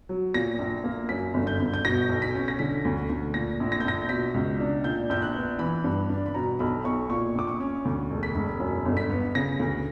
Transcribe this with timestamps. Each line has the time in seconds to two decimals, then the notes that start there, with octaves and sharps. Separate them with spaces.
0.09 F#3
0.34 A#2 A#6
0.59 A#1
0.84 A#3
1.09 F#2 B6
1.34 G1
1.47 G6
1.60 G1
1.74 G6
1.84 B2 A#6
2.09 B1
2.22 B6
2.34 C#4
2.48 A#6
2.59 D3 B6
2.85 D2
3.10 D2
3.34 A#2 A#6
3.60 A#1
3.72 A#6
3.80 G6
3.85 A#1 A#6
4.09 B2 B6
4.34 C#2
4.60 D4
4.84 A#2 G6
5.10 A#1 G6
5.22 F#6
5.34 B3
5.59 E3 B5
5.84 G2
6.10 D4
6.26 B5
6.35 B2 A#5
6.59 B1 B5
6.84 B1 C#6
7.10 A#2 C#6
7.35 A#1 D6
7.47 C#6
7.60 C#4
7.85 D2
8.10 E1
8.23 B6
8.35 E1
8.60 F#2
8.85 G1
8.97 B6
9.10 B3
9.35 C#3 A#6
9.59 D2